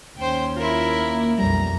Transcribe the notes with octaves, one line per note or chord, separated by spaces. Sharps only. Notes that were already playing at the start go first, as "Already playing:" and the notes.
D#2 C#4 C5 G5
E4 F4 A#4
A#3
B1 F2 G3 A#5